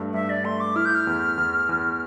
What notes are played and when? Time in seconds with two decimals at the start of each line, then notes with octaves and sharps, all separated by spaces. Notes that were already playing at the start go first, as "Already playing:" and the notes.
Already playing: G2 A3
0.14 G2 E5
0.30 D5
0.45 A3 C6
0.60 D6
0.76 E4 F6
0.85 G6
0.95 F6
1.07 E2
1.37 E2
1.69 E2